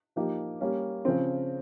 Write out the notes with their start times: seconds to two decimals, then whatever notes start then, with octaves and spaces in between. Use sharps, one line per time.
0.16 F3 A#3 D#4 G4
0.61 G3 A#3 C#4
1.05 C#3 F3 C4